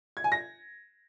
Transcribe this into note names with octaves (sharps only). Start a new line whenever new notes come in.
G#6
G#5
A#6